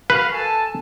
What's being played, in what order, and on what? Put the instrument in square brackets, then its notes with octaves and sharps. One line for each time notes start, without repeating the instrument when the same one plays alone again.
[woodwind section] F#4 A#4 F5 [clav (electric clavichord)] B4
[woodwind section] A4 G#5 A5